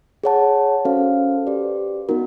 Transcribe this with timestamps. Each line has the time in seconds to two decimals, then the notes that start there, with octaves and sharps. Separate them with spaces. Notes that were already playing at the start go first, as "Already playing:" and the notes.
0.24 G#4 C#5 F#5 A5
0.85 C#4 F#4 A4 C5 F5
1.47 G4 B4 D5
2.09 B3 D#4 F#4 A#4